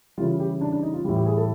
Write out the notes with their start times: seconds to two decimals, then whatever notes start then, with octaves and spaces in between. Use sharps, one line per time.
0.18 C#3 E3 G3 F4
0.40 G4
0.61 D4
0.72 D4
0.82 D#4
0.94 F4
1.04 A2 E3 G3 F4
1.15 G4
1.26 G#4
1.37 A4